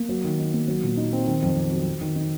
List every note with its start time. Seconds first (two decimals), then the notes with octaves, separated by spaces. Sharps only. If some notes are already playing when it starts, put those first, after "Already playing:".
Already playing: A#3
0.09 F#3
0.25 D#3
0.39 D#4
0.53 A#3
0.68 F#3
0.83 A#2
0.97 D#4
1.13 C4
1.27 D#3
1.42 F2
1.57 C4
1.71 F#3
1.87 F#3
2.01 D#3
2.16 D#4